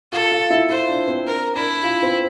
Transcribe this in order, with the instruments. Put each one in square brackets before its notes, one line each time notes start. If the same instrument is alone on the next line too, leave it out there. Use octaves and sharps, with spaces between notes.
[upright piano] F4 [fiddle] A4
[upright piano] F4
E4
[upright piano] F4 [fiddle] C5
[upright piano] D4
C4
[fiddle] A#4
[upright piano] D4 [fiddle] E4
[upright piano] F4
C4